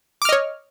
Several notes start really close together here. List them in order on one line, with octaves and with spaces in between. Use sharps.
D6 F6 D#5 C#5